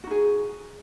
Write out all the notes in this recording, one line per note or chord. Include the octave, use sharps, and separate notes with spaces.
D#4 F#4 G#4